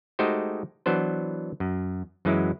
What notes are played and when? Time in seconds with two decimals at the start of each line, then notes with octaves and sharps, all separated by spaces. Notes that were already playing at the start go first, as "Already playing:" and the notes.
0.19 G#3 A3 D#4 F#4 G4 C5
0.86 E3 F#3 B3 D4 C5
1.60 F#2
2.25 F#2 E3 F#3 G#3 E4